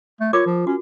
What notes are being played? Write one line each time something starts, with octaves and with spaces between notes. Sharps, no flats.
A3
F4 A#4 C#5 D6
F3
C#4 F#4